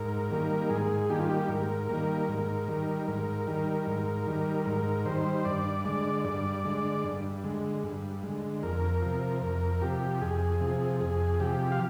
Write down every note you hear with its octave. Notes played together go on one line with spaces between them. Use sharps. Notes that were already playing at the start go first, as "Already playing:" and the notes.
Already playing: G#2 A#4
D#3 G3 A#3
G#2 G#4
D#3 G3 A#3 G4
F4
G4
G#2 A#4
D#3 G3 A#3
G#2
D#3 G3
G#2 A#4
D#3 G3
G#2
D#3 G3
G#2 A#4
D#3 G3 C5
G2 D5
D3 G#3 D5
G2 D5
D3 G#3
G2
D3 G#3
G2
D3 G#3
F2 A#4
C3 F3
F2 A#4
C3 F3 G4
F2 G#4
C3 F3
F2 G#4
C3 F3 G4
F5